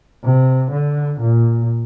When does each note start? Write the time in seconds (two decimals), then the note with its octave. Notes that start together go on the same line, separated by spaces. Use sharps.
0.25 C3
0.72 D3
1.21 A#2